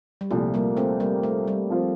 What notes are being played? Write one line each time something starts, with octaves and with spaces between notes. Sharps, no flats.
G3
C2 A#2 F3 A3
G3 A#3
A3 C4
G3 A#3
A3
G3
F3 C4 F4 C5